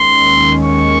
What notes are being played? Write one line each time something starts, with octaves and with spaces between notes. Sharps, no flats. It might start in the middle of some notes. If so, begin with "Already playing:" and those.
Already playing: D#2 D#3 G#3 C#4 C6
C#6